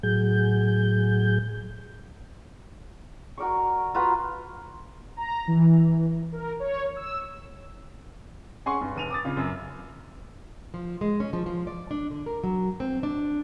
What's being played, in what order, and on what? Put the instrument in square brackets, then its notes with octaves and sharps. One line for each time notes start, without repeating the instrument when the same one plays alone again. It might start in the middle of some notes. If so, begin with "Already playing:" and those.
[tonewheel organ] A2 F#3 G#4 G6
[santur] F#4 A#4 D5 C#6
F4 F#4 B4 A#5
[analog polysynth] A#5
E3
A#4
C#5
E6
[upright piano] C#4 G#4 F#5 G#5 C6 C#6
G2
F1 D#7 F7
D6 D#6 A6
C#3 F4
F#2
[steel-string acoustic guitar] F3
G#3
C#4
F3
F3
D5
D4
D3
A#4
F#3
C4
D4